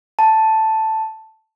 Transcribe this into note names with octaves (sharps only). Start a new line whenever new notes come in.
A5